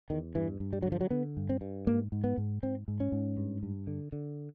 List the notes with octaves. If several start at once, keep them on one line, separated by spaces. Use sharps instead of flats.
E2 D#3
G2 E3
G2
G3
D3 F#3
F3
F#3
D3 B3
G2
C4
G2
G#2 A#3
G#2
B3
G#2
G#2 C4
G#2
C#4
G#2
G2
G2
D3
D3